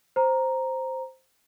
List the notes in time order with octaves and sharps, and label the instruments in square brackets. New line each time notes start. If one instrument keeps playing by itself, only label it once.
[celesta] C5 A#5